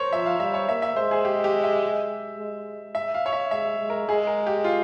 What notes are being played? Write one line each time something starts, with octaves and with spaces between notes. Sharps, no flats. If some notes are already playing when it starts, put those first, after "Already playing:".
Already playing: A#4 C5 C#5
F3 E5
F5
G3 E5
C#5
A#3 E5
E5
G#3 C5
G#4
G4
G4
E5
G#3
E5
F5
C#5
E5
G#3 E5
G#3
A#4
G#3 G#4
A#4
G4
F4